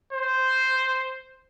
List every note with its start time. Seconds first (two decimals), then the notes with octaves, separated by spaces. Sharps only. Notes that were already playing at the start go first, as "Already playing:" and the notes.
0.13 C5